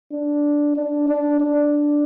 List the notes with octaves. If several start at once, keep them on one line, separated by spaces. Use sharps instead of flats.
D4
D4
D4
D4